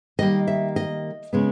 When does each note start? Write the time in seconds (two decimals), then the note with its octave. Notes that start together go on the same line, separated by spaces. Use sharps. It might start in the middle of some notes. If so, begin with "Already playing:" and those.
0.19 D#3 G3 A#3 D#5
0.48 E5
0.76 D#5
1.33 C#3 G#3 B3